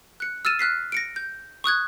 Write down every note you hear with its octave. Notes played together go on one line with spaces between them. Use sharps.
F#6 C#7
E6 F6 A6 D#7 E7
F6 F#6 B6 C7
A#6 C#7 D7
G6
C#6 D#6 F#6 G#6